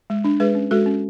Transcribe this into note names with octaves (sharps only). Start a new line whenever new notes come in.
G#3
D4
G#3 G#4 B4
C#4
G#3 F#4 A4
C#4